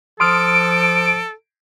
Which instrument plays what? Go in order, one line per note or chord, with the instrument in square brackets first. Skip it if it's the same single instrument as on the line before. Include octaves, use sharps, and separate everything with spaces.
[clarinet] F3 [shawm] A4 [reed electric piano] C6 D#6 F6 [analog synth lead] D7